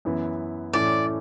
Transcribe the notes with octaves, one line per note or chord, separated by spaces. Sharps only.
F#2 E3 B3 E4
A2 E3 A3 C#4 D5